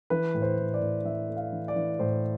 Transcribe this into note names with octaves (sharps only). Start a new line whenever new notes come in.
E3 B4
A2
C5
A2
D5
A2
E3 E5
A3
F5
E3
D5
E3
A2 C5